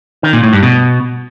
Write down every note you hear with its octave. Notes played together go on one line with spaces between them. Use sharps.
D#3
A#2
A2
G2
B2